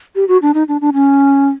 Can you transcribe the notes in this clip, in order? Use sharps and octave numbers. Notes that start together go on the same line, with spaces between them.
G4
F#4
D4
D#4
D4
D4
C#4